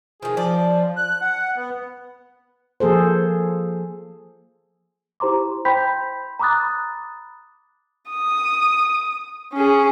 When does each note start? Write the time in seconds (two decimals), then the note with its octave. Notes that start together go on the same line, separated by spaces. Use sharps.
0.22 D#3 F3 G#4
0.37 F3 D5
0.97 F#6
1.21 F#5
1.56 B3
2.80 F3 A#3 G#4 A4 C5
5.20 E4 G4 C5 A#5 C6 D6
5.65 C5 G5 B5 C6 G6 B6
6.39 A#5 B5 D6 D#6 F#6 A6
8.10 D#6
9.54 C#4 G#4